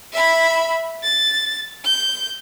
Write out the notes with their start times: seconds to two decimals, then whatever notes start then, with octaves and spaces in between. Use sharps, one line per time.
0.13 E5 B5
1.03 A6
1.84 G6